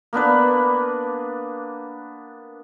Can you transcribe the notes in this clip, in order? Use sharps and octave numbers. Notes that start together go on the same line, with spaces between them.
A#3 B3 D4 B4